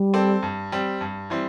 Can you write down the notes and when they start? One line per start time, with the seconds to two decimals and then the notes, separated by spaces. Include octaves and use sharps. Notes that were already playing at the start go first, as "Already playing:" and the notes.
Already playing: G3
0.14 C4 A4 D5
0.43 G2
0.72 G3 C4
1.01 G2
1.30 E3 G3 C4